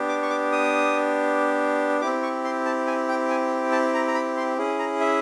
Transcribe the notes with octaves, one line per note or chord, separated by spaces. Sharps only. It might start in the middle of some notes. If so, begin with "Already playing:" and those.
Already playing: B3 D4 G4
D6
C#6
D6
D#6
C4 E4 G4 D6
C#6
C6
A5
G#5
G5
G#5
A5
A#5
A#5
B5
C6
C#4 E4 G#4
A#5
E5